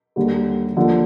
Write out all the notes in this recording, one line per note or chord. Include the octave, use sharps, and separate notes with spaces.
D#2 D3 G3
D#2 D3 F3